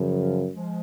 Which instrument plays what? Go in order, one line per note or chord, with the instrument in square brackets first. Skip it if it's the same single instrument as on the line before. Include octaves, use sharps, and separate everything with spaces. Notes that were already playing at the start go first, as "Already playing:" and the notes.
Already playing: [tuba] F#2 [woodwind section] C#3 F3
[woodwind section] F3 G#3